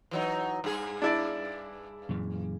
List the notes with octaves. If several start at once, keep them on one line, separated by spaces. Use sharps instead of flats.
E3 F#3 D#4
G2 G#4
D4 E4 D5
F#2 A#2 E3